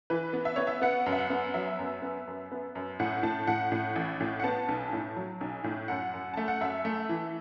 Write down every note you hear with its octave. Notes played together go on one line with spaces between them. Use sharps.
E3 B4
B3
E5
B3 C#5
E5
B3 F#5
F#2
E5
F#5
B3
F#3 E5
F#2
B3
F#2
B3
F#2
A2 F#5
A2 A5
A2 F#5
A2
A1
A2
F#5
B3 A5
B1
A2
F#3
B1
A2
F#2 F#5
F#2
A3 A5
F#5
F#2 E5
A3
E3